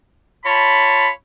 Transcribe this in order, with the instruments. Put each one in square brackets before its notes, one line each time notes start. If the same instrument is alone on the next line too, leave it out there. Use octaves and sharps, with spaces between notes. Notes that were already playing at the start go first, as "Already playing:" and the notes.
[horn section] F4 C#5 A5 B5